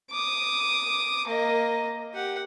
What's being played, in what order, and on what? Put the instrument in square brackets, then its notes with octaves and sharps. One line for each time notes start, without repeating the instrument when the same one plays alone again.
[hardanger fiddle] D6 D#6
A#3 D#5
G4 F#5